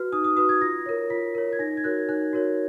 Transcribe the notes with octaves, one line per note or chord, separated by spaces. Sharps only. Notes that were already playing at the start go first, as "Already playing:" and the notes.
Already playing: F#4 B4 F6
D#4 D#6
D#6
F#4 B4 D#6
G#6
F4 A#6
A#4 C#5
F4 B6
A#4 C#5
G#6
D#4 A#6
G#6
F#4 A#4 C#5 F#6
D#4 F#6
F#4 A#4 C#5